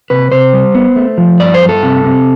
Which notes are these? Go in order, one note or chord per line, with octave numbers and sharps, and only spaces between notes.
C3 B4
C3 C5
G3
B3
A3
F3
G2 D5
C5
G2
A4
C3
C3